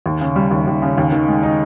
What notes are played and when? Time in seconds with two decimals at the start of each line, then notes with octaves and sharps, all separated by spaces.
0.06 D#2
0.21 C#3
0.36 G3
0.51 D#2
0.67 D#2
0.82 C#3
0.98 D#2
1.12 D#3
1.28 G#3
1.43 D#4